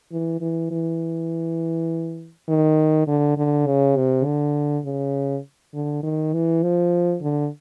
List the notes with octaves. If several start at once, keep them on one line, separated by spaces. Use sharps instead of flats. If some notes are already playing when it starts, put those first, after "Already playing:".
E3
E3
E3
D#3
D3
D3
C#3
C3
D3
C#3
D3
D#3
E3
F3
D3